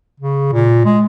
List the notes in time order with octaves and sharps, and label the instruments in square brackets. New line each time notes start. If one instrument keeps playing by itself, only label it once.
[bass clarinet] C#3
A#2
G#3